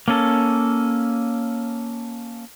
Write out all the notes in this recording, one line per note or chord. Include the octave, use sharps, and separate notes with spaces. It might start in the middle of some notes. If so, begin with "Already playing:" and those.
A#3 C#4 A4